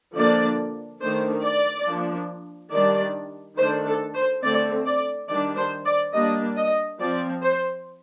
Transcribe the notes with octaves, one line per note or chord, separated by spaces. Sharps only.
D3 F3 A#3 D4 D5
D#3 A3 D4 C5
D5
F3 A#3 D4
D#3 G3 D4 D5
D#3 A3 D4 C5
A4
C5
D3 A3 C4 D5
D5
D#3 G3 D4 D5
C5
D5
G3 A#3 D4 D#5
D#5
F3 C4 D5
C5